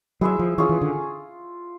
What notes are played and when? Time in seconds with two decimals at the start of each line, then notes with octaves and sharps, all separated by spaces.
0.21 F#3 E4 G#4 C5 E5
0.39 F3
0.58 E3 C#4 F4 G#4
0.69 E3
0.81 D3